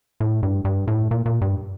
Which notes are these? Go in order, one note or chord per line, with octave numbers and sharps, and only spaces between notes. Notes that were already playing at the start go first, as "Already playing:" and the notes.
A2
G2
G2
A2
A#2
A#2
G2